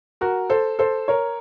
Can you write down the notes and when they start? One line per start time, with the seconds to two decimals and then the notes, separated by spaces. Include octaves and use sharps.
0.21 F#4 A#4
0.50 A4 C5
0.79 A4 C5
1.08 A#4 C#5